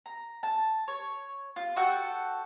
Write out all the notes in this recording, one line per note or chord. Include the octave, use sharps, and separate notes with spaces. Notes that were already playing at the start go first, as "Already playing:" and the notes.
A#5
A5
C#5
F4
F#4 A4 F#5 G5